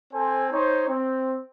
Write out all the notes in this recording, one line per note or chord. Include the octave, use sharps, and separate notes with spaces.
C4 A4 C5 G#5
D#4 C5 C#5
C4